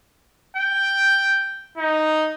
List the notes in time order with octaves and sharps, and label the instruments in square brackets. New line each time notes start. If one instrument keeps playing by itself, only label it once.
[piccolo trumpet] G5
D#4